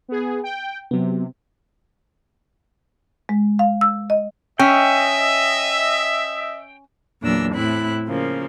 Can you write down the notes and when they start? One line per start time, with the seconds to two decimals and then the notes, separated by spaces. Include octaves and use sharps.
0.08 B3 G#4
0.43 G5
0.91 C3 F#3 B3
3.29 G#3
3.59 F5
3.81 E6
4.10 D#5
4.59 C#4 D#5 E5 G5
7.22 E2 A#2 F#3 D4 E6 A#6
7.54 A2 C4 E4 B5 F#6
8.08 C#3 F3 A#3